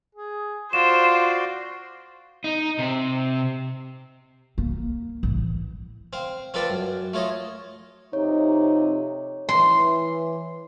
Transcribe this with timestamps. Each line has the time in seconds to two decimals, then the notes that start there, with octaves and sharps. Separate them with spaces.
0.15 G#4
0.73 F4 F#4 C5 D5 E7
2.44 D#4
2.79 C3
4.58 A#3
5.23 A1
6.13 C4 F5
6.54 C4 F4 A4 B4 D5 F5
6.70 F#2
7.13 A3 F4 C#5 D#5
8.13 F2 C3 D#4 C#5
9.49 E3 C6